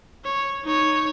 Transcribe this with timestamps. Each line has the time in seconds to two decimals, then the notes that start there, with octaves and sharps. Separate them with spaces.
0.24 C#5
0.64 D#4 C#5